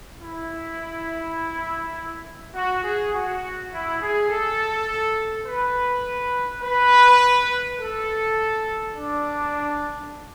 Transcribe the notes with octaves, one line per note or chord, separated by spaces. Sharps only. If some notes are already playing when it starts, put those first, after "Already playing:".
E4
F#4
G#4
F#4
E4
G#4
A4
B4
B4
A4
D4